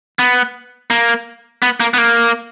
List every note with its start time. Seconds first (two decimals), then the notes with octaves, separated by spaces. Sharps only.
0.19 B3
0.90 A#3
1.62 B3
1.80 A#3
1.94 B3
1.98 A#3